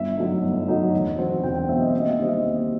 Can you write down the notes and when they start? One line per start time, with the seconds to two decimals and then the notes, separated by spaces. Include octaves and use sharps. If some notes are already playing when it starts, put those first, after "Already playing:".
Already playing: G1 E5
0.17 F#2 F#3 A3 D#4
0.43 G1
0.68 F#2 F#3 A3 D#4
0.94 E1
1.18 E2 B2 F#3 C4
1.43 E1 G5
1.56 G5
1.69 E2 B2 F#3 C4 E5
1.80 D#5
1.90 D#2 E5
2.00 D#5
2.09 E5
2.19 D#3 G3 C4 D#5
2.29 E5
2.39 D#5
2.44 D#2